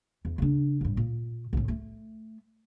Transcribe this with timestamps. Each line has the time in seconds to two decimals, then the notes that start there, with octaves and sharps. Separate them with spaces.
0.25 E2
0.38 C#3 D4
0.81 A1 G2
0.97 A#2
1.53 B1 A2
1.68 A3